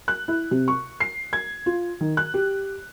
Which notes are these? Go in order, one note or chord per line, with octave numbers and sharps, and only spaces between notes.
F#6
E4
C3
C#6
C7
G#6
F4
D#3
F#6
G4